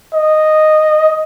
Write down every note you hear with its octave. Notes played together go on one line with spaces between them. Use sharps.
D#5